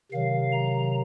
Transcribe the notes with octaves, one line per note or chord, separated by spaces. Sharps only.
C3 D#3 F#3 F5
A#5